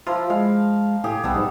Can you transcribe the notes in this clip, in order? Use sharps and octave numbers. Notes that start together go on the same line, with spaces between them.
F3 E4 F4 A#4
G#3 F5
A2 G4 G#4
B1 G3 B3 A4
G#2